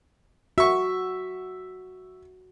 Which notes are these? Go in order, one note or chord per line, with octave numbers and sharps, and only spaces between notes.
F#4 E5 C#6